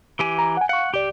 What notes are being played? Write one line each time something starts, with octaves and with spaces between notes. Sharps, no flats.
E3 G4 G#5
A#5
F#5 G#5
F5 F#5 C#6
C#2 G4 D5